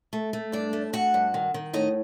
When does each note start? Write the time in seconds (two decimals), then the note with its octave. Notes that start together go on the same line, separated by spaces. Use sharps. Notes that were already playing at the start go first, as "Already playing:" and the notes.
0.13 A3
0.33 A3
0.52 G2 D4 D5
0.73 A3
0.93 A3 F#4 F#5
1.14 G2
1.34 D#3
1.54 D#3
1.73 A2 D#4 D#5